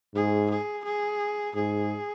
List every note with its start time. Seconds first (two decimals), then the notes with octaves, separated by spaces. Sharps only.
0.15 G#2 G#4
0.51 G#4
0.85 G#4
1.55 G#2 G#4